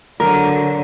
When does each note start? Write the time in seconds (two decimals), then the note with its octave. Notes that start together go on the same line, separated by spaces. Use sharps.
0.20 D3 F#3 A#4